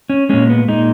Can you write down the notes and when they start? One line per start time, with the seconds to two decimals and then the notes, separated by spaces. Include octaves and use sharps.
0.10 C#4
0.29 A#2 G#3 C#4
0.49 B3
0.68 A#2 G#3 D#4